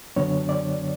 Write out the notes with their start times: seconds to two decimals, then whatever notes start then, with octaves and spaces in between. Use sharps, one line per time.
0.16 F#2 D3 F#3 B3 D4 C#5
0.49 D5